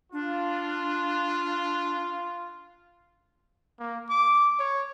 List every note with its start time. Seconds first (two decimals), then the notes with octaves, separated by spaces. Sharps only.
0.13 D4 F4
3.80 A#3
4.09 D6
4.59 C#5